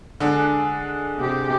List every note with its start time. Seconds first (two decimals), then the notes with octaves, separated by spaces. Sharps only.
0.20 D3 G#3 D4 G#4
1.19 C3 G4